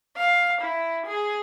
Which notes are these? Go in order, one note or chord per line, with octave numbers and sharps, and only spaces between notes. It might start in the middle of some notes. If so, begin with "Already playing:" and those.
F5
E4
G#4